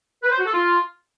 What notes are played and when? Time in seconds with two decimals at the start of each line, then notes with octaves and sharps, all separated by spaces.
0.23 B4
0.30 C5
0.38 F#4
0.46 A4
0.53 F4